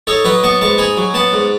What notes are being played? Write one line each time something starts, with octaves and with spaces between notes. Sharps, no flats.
D#4 A4 C#5
F#3 B4 D#5
B3 A5 C#6
G#2 A5 C#6
D#4 G#5 B5
F#3
B3 F#5 A5
G#2